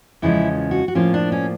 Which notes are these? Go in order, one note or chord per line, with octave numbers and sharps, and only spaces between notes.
E2 C#3 F3 G#3 C#4 E4
F#4
F#4
A2 F3 A#3 C#4 F4
D4
C#4